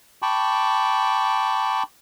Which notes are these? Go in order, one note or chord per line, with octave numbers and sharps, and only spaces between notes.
G5 A5 B5 C#6 D6